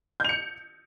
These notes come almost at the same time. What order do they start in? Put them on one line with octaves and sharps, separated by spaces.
G6 F7 C#7